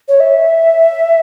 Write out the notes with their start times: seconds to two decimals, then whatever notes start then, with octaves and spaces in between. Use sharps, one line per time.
0.08 C#5
0.20 E5